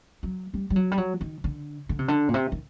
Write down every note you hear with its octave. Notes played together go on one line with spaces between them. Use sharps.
F#3
G3
G3
F#3
G3
F#3
D#3
D3
D3
C3
D3
A#2
C3
D#3